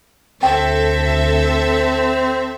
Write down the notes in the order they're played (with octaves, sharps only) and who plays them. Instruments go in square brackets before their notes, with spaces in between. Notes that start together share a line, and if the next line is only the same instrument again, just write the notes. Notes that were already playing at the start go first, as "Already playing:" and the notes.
[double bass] D2 [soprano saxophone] C4 [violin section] A4 E5 [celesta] G5